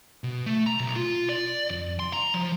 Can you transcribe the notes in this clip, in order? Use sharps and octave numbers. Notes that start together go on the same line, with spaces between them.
B2
A3
A#5
B1
F4
D5
F2
C6
A#5
F3